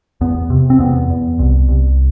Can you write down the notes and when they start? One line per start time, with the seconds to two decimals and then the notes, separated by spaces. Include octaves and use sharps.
0.21 E2 B3
0.50 C3
0.70 C4
0.79 E2 B3
1.10 E2
1.39 C2
1.68 C2